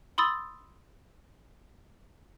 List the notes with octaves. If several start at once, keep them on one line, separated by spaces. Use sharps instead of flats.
B5 C6 D#6 E6 A6